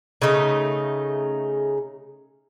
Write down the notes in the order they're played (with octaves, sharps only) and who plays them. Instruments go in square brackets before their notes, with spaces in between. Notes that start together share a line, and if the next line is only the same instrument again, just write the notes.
[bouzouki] C#3 A3 D#4